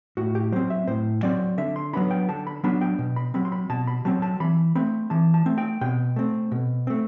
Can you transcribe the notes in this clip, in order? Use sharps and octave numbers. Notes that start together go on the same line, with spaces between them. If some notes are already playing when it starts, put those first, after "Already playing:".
A2 F#4
G4
F#3 C4 C5
E5
A2 C5
F#3 C4 D5
D3 E5
C6
F#3 B3 D4 B5
G5
D3 A5
B5
F#3 B3 D4 B5
G5
B2
B5
F#3 C4 B5
C6
B5
B2 A5
B5
F#3 C4 A5
A5
E3 B5
A3 C4 B5
E3 A5
A5
A3 C4
G5
B2 G5
A3 C4
B2
A3 C4